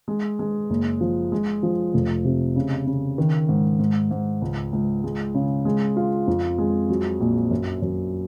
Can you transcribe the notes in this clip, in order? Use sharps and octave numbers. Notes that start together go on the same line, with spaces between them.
G#3
G#3
F#1
F3
G#3
F3
F1
C3
C#3
C#3
D#3
G#2
G#2
G#2
C#2
C#2
G#3
C#3
G#3
F4
F2
G#3
F#3
A#1
F#2
F#2